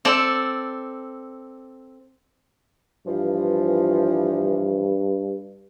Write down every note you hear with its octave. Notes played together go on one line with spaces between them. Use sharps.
C4 A4 D5
G2 E3 F3